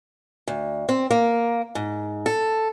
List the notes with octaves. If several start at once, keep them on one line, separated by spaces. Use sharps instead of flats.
D2
C4
A#3
G#2
A4